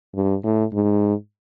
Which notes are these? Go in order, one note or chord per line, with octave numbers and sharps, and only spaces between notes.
G2
A2
G#2